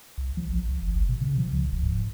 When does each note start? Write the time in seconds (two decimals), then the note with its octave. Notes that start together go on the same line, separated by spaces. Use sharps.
0.18 C2
0.37 F3
0.50 A1
0.68 C2
0.82 F#1
0.95 G#1
1.09 B2
1.22 C#3
1.38 F3
1.52 C#2
1.71 D#1
1.83 G#2